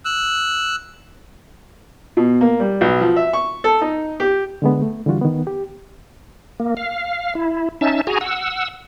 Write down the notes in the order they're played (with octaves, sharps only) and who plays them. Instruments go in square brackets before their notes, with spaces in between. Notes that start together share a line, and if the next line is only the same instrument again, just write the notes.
[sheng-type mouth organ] E6 F#6
[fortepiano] B2
A#3
G3
B1
F3
E5
C#6
A4
D#4
G4
[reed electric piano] D3 G#3 B3
A3
D3 E3 G3 F4 F#4
D#3 B3
G4
[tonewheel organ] A#3
F5
E4
C#4 D#4 E5 A5
F#4 G#4 G#5 A#5
F#5 E6